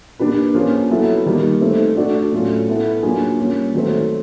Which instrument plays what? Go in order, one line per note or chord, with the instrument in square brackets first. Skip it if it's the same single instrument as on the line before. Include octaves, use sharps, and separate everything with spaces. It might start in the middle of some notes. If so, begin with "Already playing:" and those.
[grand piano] A#3 D4 G4 B4
F3 A#3 C#4 F4 G#4
F#3 B3 E4 A4
D#3 G3 A#3
A3 C4 D#4
A3 D4 F#4 A4 D5
A2 F#3 A3 C#4 F4
B3 E4 A4
F#3 A#3 D4 F4 G#4
G3 A#3 C#4 F4
D#3 F#3 A3 C4